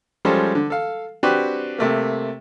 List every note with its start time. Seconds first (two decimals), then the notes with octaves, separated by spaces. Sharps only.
0.25 F3 G3 G#3 C#4 A4 C5
0.55 D3
0.70 A4 F5
1.23 C4 D4 F#4 G4 B4
1.78 C3 A3 A#3